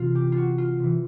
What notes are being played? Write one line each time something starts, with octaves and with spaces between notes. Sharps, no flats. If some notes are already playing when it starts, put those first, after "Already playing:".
Already playing: C3 E3 F4
G4
F4
F#4
F4
C3 E3